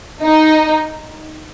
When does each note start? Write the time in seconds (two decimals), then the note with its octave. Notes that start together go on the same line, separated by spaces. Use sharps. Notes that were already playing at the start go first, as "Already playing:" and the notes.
0.23 D#4